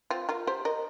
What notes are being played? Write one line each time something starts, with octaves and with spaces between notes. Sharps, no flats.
C4 F4
F4 A#4
G4 C5
A#4 D#5